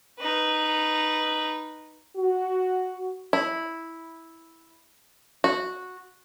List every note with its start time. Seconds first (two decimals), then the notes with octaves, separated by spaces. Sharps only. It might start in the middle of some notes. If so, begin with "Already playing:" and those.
0.19 D#4 B4
2.17 F#4
3.33 E4
5.44 F#4